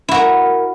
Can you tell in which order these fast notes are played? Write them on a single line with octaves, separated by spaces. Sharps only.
E4 F#4 A#4